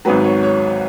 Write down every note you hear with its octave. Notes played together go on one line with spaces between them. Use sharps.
G#1 G#2 F#3 B4
C#5
C#5